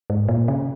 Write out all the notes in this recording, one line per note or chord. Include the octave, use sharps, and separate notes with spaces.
G#2
A#2
C#3